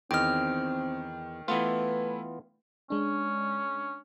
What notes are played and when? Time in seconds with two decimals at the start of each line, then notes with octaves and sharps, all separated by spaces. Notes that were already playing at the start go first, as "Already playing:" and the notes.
0.11 E2 D#3 C4 D#5 G5 F6
1.48 E3 A3 B3 E4 F4 B4
2.90 G#3 C#4 D4